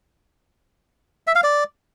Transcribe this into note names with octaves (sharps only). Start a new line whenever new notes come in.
E5
F5
D5